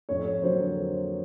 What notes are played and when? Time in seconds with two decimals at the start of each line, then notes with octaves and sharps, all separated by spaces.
0.09 F2 C#5
0.25 C#5
0.42 D3 F#3 A#3 C5